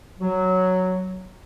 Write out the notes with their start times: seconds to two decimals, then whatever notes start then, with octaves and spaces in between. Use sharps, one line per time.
0.19 F#3